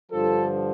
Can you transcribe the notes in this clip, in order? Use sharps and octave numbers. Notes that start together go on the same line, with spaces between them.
G2 D3 F3 F4 A4